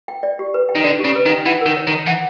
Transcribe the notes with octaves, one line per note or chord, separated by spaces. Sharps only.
G5
D5
G4
B4
G5
D#3
D3 D5
G4
C#3
B4
D#3
G5
E3 F#5
D#3 A#4
C#5
D#3
A#5
E3 F#5